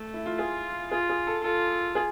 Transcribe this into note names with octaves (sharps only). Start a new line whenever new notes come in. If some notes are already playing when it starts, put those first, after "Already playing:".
Already playing: A3
E4
F4
F4 G#4
F4 G#4
G#4
A4
F4 A4
G#4